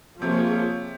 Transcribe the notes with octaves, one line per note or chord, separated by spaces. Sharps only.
C3 F3 A#3 F4 G#4 C#5